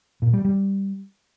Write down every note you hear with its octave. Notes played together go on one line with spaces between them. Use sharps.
A#2
G3
G3